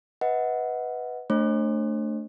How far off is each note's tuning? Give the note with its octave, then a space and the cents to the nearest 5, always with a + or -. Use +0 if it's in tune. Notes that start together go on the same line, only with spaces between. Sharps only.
B4 +0 D#5 +40 F#5 -5
A3 +5 D4 +0 C5 +45